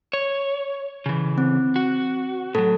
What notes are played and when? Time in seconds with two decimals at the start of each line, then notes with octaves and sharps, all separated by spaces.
0.13 C#5
1.06 C#3 E3
1.38 C4
1.76 F#4
2.55 A2 F#3 A4